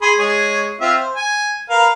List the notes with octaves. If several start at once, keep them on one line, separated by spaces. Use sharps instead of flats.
G#4 B5 C6
G#3 G#4 C#5
C4 F4 E5
C5
G#5
A#4 B4 F5